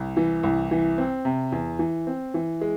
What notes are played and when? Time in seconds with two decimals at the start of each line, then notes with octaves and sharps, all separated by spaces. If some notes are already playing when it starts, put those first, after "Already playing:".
Already playing: C2
0.17 E3
0.43 C2
0.71 E3
0.98 C4
1.25 C3
1.52 E2
1.79 E3
2.07 C4
2.34 E3
2.61 G#3